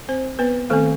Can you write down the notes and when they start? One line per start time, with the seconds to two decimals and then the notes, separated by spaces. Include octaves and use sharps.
0.08 C4 C5
0.39 B3 B4
0.70 D#3 A3 C4 A4